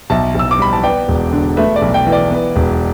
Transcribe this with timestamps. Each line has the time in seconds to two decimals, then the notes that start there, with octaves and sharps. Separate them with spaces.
0.10 B1 E5 A5
0.35 B1 E6
0.51 D6
0.59 G3 B5
0.73 A5
0.83 B3 D5 G5
1.08 E1
1.33 D3
1.57 A3 B4 E5
1.76 D5
1.82 B1
1.94 D5 G5
2.07 E3
2.12 D5
2.31 B3
2.56 E1